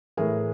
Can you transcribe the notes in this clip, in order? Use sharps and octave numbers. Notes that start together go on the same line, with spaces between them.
A2 E3 G#4 A#4